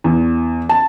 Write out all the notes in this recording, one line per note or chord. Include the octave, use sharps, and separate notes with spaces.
E2
A5